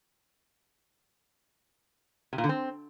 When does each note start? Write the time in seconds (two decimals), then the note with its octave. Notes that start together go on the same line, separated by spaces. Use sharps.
2.33 C3
2.38 A#2
2.44 D3
2.49 C4